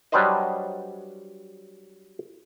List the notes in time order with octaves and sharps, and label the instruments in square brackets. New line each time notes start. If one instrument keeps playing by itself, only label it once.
[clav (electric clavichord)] F#3 G3 D4 B4 C5 D#5